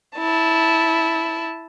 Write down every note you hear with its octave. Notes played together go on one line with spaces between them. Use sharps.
E4 A5